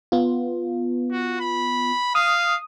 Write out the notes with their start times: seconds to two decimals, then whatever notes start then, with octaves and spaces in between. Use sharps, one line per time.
0.12 B3 F4
1.12 F#4
1.40 B5
2.15 F5 D#6